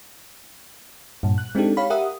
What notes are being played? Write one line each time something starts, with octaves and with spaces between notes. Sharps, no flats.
G2 A#2
F#6
G#3 C4 D4 D#4 G4 A4
G4 C#5 F5 B5
G4 A#4 E5 F#5 D#6